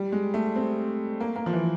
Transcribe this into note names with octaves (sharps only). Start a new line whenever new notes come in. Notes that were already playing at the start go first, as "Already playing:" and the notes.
Already playing: G3
G#3
A3
C4
A#3
A#3
F3
E3